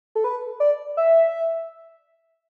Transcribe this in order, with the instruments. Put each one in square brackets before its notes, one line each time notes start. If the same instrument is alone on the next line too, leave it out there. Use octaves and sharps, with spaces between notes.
[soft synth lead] A4
B4
D5
E5